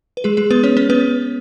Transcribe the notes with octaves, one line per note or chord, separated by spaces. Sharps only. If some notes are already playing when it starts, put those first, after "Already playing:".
B4
G#3 G#4
G#3 G#4
B3 B4
C#4 C#5
C#4 C#5
B3 B4